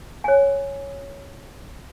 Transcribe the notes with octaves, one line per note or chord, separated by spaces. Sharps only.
C#5 G#5